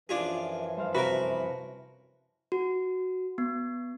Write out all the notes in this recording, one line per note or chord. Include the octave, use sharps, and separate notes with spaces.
F#2 E3 F3 D4 F4 G#4
G2 C5 F5
C3 F#4 A#4 B4
F#4
B3